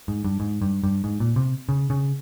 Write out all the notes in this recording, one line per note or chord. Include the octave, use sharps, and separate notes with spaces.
G#2
G2
G#2
G2
G2
G#2
A#2
C3
C#3
C#3